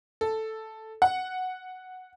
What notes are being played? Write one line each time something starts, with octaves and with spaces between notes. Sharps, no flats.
A4
F#5